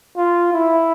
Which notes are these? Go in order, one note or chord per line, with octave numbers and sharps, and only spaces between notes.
F4
E4